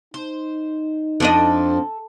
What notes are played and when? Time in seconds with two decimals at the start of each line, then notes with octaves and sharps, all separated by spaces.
0.14 D#4 C5
1.20 F2 D4 A4 D#5